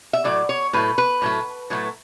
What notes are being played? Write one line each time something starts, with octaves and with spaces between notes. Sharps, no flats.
E5
A2 F#3 A3 D5
C#5
A2 F#3 A3 B4
B4
A2 F#3 A3
A2 F#3 A3